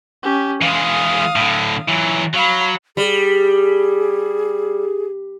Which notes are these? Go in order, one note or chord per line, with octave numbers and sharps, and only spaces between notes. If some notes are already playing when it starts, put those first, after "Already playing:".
C#4 G4
E3 G#3 F5 D#6
A2 D3
E3 F#3
F#3 F5 B5
G3 G#4